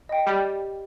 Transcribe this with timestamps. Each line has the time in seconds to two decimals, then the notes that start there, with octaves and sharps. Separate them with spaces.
0.09 D#5 G5
0.26 G3 G4